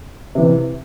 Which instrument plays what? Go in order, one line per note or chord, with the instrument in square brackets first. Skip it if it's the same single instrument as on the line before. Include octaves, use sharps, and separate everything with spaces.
[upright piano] C3 E3